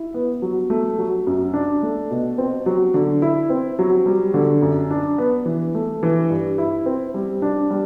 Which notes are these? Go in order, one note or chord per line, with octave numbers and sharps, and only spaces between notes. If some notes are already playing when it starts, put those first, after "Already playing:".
Already playing: E4
B3
F#3
A3
F#3
F#2
D4
A3
B2
C4
F#3
D3
E4
C4
F#3
G3
D3
F#2
D4
B3
E3
A3
E3
G2
E4
C4
G3
D4
G3